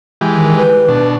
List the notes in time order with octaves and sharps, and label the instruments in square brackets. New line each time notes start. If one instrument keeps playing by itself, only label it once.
[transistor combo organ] E3 G#3 G4
[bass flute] D#3
B4
[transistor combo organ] B2 D4